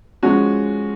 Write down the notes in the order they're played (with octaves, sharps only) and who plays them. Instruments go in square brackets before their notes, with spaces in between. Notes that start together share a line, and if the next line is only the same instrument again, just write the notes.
[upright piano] F3 G#3 C#4 F#4